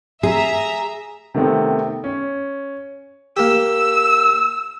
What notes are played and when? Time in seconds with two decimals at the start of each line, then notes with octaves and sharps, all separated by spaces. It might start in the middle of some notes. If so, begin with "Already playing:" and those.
0.23 G#4 E5 A#5
1.34 C3 D#3 A3 B3 C4
2.04 C#4
3.37 A#3 G4 E6